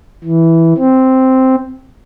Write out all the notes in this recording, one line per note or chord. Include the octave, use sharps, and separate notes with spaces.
E3
C4